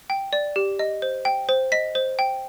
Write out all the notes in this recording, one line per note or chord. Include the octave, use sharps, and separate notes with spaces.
G5
D5
G4
D#5
C5
G5
C5
D#5 B6
C5
G5